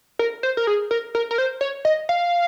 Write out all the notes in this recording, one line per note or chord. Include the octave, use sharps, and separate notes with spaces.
A#4
C5
A#4
G#4
A#4
A#4
A#4
C5
C#5
D#5
F5